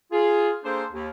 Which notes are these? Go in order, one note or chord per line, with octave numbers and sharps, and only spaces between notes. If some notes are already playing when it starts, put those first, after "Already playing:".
F4 G#4
A#3 D4 G#4 A4 C5
D#2